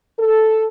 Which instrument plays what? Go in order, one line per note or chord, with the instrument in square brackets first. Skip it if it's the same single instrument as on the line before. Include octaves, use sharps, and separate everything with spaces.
[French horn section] A4